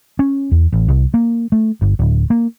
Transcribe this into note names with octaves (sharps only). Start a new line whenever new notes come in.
C#4
E2
A1
C2
A#3
A3
G1
D1
A#3